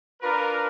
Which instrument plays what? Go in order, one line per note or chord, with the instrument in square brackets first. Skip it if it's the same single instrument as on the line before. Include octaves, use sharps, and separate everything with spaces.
[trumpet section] D4 F4 A#4 [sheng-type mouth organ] B4